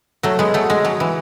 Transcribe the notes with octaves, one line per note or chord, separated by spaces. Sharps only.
F#3 A3
G#3 B3
F#3 A3
G#3
F#3
E3